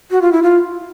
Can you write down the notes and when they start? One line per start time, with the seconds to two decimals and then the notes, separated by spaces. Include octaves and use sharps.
0.11 F#4
0.21 F4
0.32 E4
0.42 F4